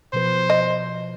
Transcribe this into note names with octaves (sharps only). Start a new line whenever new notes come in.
B2 F3 B4 C5
D#5